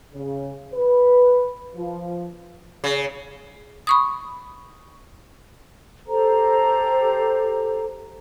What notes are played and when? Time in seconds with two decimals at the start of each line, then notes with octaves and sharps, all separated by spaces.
0.14 C#3
0.74 B4
1.75 F3
2.84 C#3
3.87 B5 C#6 D#6
6.07 G4 A4 C5 A#5